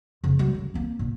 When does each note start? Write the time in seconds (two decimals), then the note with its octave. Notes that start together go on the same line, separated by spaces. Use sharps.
0.24 F2 C#3
0.39 F#3 G#3
0.54 D3
0.74 A#3 C4
0.99 A#2